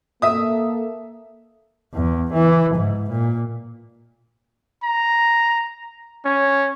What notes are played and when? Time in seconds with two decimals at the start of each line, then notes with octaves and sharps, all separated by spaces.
0.22 A#3 A4 E5 D#6
1.94 E2
2.33 E3
2.75 G#2
3.10 A#2
4.83 A#5
6.25 C#4